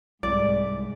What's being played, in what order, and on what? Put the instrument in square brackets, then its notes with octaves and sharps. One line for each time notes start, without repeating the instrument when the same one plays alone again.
[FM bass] C2 [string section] G#2 [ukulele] D5